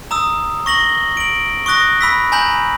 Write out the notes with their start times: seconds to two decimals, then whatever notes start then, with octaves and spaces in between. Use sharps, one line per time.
0.11 A#5 D#6 E6
0.66 C#6 A#6 F#7 G7
1.17 D7 F#7
1.66 C#6 D#6 F#6 A#6
2.01 B5 E6 B6
2.32 G#5 A#5 B5 G6 F#7